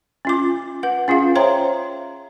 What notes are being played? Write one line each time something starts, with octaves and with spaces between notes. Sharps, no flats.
C#4 F4 D6
B4 F#5
C#4 F4 G#4 F5
C5 C#5 E5 G5 A#5 C6